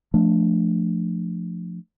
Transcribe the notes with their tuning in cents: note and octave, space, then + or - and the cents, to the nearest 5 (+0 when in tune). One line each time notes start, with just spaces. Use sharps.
F3 +0 A3 +0 D4 +0